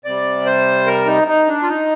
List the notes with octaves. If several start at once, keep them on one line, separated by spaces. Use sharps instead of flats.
C3 G3 D5
C5
A#4
D#4
D#4
D4
F4
D#4